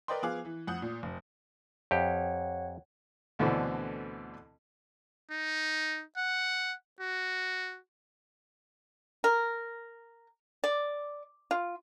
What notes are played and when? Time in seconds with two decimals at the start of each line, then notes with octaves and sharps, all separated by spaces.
0.08 A#4 B4 D5 D#5 G5 C6
0.22 F3 B3 G#4 F5 D6 F#6
0.45 E3
0.67 F2 F#5 D#6 G6
0.82 A#2
1.03 F1
1.91 F2 G4 C#5 F#5
3.39 D2 B2 D3 E3 C4
5.31 D#4
6.17 F#5
7.00 F#4
9.24 A#4
10.64 D5
11.51 F4